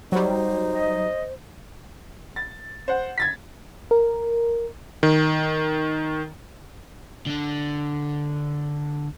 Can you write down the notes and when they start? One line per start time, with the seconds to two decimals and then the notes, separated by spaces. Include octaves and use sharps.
0.12 F#3 G3 D#4 C5
0.73 D#5
2.36 A6
2.88 C5 F#5
3.18 G#6 A6 B6
3.91 A#4
5.03 D#3
7.26 D3 D4